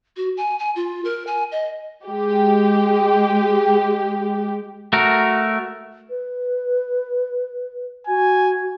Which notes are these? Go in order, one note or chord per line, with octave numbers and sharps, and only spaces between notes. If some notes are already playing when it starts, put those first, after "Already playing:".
F#4
G#5
G#5
F4
A#4
G#5
D#5
G#3 G4
A3 F#4 A#4
B4
F#4 G#5